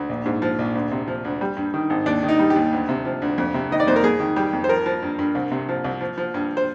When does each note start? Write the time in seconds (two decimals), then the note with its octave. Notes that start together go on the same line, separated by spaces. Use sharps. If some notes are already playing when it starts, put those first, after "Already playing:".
Already playing: D2
0.09 A#1
0.26 G#2
0.42 F3
0.59 A#1
0.75 D2
0.92 C3
1.08 F3
1.25 D2
1.41 G3
1.57 G2
1.74 D#3
1.90 G#1
2.06 D#2 D4
2.23 D#3
2.28 D#4
2.39 G3
2.50 G4
2.56 D#2
2.72 D2
2.89 C3
3.05 F3
3.22 D2
3.38 F2
3.54 C3
3.71 D#3 D#5
3.80 D5
3.87 F2 C5
3.96 A#4
4.04 F2 G#4
4.20 D#3
4.36 G3 G4
4.53 F2
4.64 C5
4.69 F3 A#4
4.86 F3
5.03 G2
5.19 G2
5.35 C2
5.51 C3
5.69 F3
5.84 C2
6.01 F3
6.18 F3
6.34 G2
6.57 C5